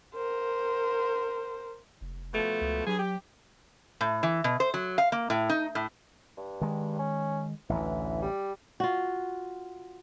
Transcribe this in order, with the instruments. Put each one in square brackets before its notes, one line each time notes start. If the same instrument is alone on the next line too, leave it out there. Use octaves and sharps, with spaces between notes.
[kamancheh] A#4 C5
[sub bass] F1
[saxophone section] B2 F3 A3
[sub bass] C#2
[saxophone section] G2 G#4 [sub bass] F#3
[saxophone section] G4
[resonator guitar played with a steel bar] A2
E3
B2
C5
F#3
F5
A#3
A2
D#4
A2
[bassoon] G2
[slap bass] D#3 G#3
[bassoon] C#4
[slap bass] A1 D2 [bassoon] E3
[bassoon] G3
[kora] F4 F#4